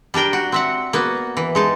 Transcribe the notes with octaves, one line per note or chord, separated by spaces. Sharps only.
G3 D4 A#4 G5
F#4
C4 E5 F#5
A#3 B3 F#4
E3
G#3 D#4 A5